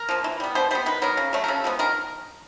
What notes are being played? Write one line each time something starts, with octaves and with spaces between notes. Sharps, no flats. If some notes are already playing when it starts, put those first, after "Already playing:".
Already playing: A#4
F3 A#3
E3
G3 B3
B2 C5
G3 B3 C5
D#3 B4
F#3 B3 A#4
C#3
F#3 A3
A#4
C#3 A4
F3 G#3 B3
D#3 A#4